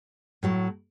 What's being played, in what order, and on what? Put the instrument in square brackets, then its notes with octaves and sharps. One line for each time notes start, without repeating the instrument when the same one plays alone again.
[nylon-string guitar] A2 F#3 A3